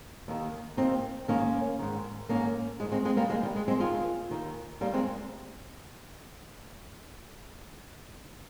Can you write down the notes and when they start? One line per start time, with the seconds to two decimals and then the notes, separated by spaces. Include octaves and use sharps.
0.28 D#2 D#3
0.77 D#2 D#3 C4 D#4
1.28 G#2 D#3 A#3 C#4
1.79 G#2 D#3
2.29 G#2 D#3 A#3 C#4
2.79 G#2 G#3
2.83 D#3
2.92 G#3 C4
3.05 G#3 C4
3.17 G3 A#3
3.30 D#2 D#3 G#3
3.43 G3
3.56 G#3
3.68 G#3 C4
3.80 D#2 D#3 F4 G#4
4.31 D#2 D#3
4.81 D#2 D#3 G3 A#3
4.93 G#3 C4